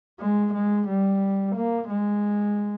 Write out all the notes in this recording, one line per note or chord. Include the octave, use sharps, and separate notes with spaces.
G#3
G#3
G3
A#3
G#3